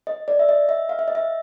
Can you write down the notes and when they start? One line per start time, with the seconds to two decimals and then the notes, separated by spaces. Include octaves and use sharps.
0.07 D#5
0.28 D5
0.39 E5
0.49 D#5
0.69 E5
0.89 F5
0.99 E5
1.08 D#5
1.15 E5